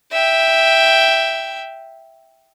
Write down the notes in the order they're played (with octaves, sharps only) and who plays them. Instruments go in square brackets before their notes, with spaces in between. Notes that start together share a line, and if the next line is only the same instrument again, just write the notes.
[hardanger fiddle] E5 G5